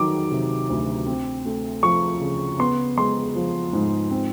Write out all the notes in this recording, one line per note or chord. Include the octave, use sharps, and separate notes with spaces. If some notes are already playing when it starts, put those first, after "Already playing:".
Already playing: D#3 F#3 D6
C3
D2
C4
A3
F3 C#6
C#3
B3 C6
G#3 C6
F3
G#2
C4